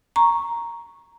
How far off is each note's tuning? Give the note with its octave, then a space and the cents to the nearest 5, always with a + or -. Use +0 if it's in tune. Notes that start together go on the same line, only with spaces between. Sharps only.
A#5 +0 C#6 -5